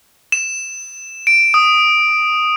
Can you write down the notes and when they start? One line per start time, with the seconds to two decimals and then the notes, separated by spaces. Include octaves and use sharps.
0.32 E7
1.27 D7
1.54 D#6